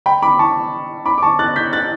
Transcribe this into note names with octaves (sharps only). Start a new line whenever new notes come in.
G5 B5
B5 D6
A5 C#6
B5 D6
D6
A5 C#6
F#6 A6
G6 B6
F#6 A6